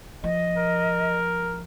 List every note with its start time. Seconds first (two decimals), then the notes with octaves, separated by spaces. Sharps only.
0.24 F3 D#5
0.58 A#4